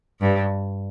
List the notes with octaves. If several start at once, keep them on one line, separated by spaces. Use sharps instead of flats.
G2